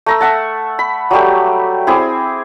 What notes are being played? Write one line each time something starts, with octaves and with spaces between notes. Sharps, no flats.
A3 A#5 E6
E5 F#5 A5
B5
F#3 G3 A3 G4
C4 E4 G#4 D6